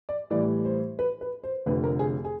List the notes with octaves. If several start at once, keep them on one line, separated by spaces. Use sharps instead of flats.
D5
A2 E3 G3 D5
C5
B4
B4
C5
F1 F2 D3 B4
A#4
G#4
G#4